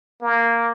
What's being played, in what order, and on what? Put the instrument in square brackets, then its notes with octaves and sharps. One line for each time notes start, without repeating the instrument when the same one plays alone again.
[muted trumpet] A#3